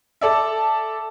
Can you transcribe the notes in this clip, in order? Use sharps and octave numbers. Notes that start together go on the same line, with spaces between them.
A4 D5 E5